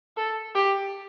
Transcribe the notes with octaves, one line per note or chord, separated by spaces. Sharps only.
A4
G4